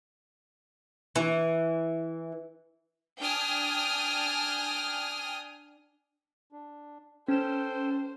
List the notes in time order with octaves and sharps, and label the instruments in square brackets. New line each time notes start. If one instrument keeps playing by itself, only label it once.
[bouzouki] E3
[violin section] D4 G5 G#5 D#6 F6
[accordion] D4
[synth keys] C#4 E7 [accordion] A4 G5 [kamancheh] C5